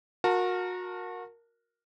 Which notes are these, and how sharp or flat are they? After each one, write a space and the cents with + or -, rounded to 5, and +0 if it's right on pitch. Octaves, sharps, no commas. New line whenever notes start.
F#4 -30 A#4 +0 A5 +15